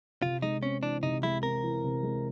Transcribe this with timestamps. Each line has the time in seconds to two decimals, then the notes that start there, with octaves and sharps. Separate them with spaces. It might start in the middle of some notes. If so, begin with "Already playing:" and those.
0.22 C3 F4
0.42 G#3 D#4
0.63 C4 C#4
0.82 E3 D4
1.03 C3 D#4
1.23 G#3 E4
1.43 C4 A#4
1.63 E3
1.84 C3
2.03 G#3